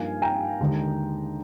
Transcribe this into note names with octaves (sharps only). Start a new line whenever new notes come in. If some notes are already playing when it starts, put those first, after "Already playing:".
Already playing: G2 F3 A#3 D#4 F5 G#5
G5 A#5
D#2 D3 G#3 D#4